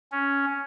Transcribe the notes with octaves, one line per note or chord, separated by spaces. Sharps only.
C#4